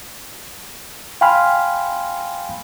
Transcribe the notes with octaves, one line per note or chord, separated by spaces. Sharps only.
F5 G5 G#5 B5 C6 F6